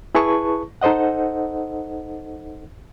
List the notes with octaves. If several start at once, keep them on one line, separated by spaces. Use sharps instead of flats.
E4 G#4 B4 A5 C#6
D#4 A4 C5 D#5 F#5